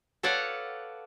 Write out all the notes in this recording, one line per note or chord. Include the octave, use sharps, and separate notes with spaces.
A4 B4 C#5 D5 F5 F#5